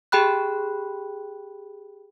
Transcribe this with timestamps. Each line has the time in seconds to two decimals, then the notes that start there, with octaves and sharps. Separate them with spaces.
0.12 G4 G#4 G5 B5 F#6